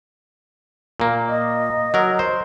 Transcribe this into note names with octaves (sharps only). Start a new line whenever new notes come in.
A#2 A#3
D#5
F#3 A#4
C5